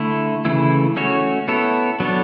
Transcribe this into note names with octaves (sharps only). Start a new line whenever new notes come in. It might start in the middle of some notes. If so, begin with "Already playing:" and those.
Already playing: D3 A3 E4
C#3 E3 A3 E4
A3 C#4 F#4 C#5
B3 E4 A4 C#5
F#3 B3 D4 A4 C#5